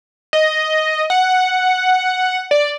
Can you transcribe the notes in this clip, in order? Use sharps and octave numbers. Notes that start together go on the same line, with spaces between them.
D#5
F#5
D5